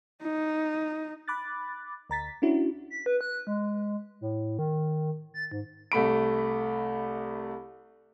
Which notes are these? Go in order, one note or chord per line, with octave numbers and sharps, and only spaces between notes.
D#4
B5 D6 F#6 A6
D2 A#5 A6 B6
C#4 D4 E4 F#4
B6
B4
F#6
G#3
A2
D#3
A6
G#2
C2 A3 B5 D7